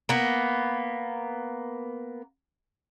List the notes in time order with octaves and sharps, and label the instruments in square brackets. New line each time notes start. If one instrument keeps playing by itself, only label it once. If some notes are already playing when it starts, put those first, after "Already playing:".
[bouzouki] A#3 B3